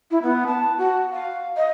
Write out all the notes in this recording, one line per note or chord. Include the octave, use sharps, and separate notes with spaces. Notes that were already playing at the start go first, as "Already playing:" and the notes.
E4
B3
A5
F#4
F5
D#5